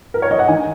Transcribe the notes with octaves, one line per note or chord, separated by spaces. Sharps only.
A#4
C#5
D#5
F#5
D#3 G#5